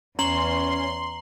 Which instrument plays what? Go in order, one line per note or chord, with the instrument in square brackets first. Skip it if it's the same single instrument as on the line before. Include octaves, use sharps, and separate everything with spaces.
[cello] E2 [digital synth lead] C#4 [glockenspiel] A#5 F#7 [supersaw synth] C6